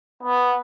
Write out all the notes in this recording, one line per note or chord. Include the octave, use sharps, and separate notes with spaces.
B3